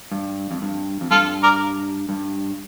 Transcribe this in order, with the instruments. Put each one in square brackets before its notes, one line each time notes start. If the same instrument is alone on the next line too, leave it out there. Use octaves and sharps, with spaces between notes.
[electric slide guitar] G2
F2
G2
F2
[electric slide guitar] G2 [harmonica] F4 A4
[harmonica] A#4 D5
[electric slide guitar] G2